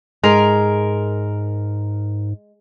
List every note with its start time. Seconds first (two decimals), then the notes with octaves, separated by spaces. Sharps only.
0.24 G#2 G#3 A#4